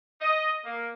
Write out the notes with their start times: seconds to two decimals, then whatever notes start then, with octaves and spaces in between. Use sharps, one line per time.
0.21 D#5
0.64 A#3